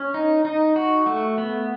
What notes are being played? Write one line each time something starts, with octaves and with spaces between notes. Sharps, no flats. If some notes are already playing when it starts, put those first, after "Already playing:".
Already playing: C#4
D#4
D#4
F#4
A3
B3